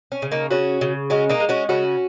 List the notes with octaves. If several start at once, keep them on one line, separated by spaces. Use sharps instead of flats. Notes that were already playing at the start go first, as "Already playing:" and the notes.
C#4
C#3
A#3 D#4
C#3 C#4 F#4
C#3
G#3 C#4 F#4
A#3 D#4
G#3
C#4 F#4
C#3 C#4 F#4